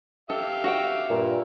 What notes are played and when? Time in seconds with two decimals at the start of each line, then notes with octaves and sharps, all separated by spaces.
0.30 G4 A4 E5 F5
0.64 F#4 F#5 G5
1.09 G2 A#2